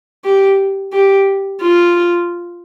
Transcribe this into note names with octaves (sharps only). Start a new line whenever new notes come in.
G4
G4
F4